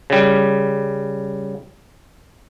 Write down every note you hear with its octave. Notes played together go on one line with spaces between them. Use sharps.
C#3 G3